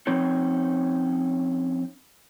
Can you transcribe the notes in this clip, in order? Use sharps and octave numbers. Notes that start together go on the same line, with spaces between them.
F3 C4 C#4 D#4 C#5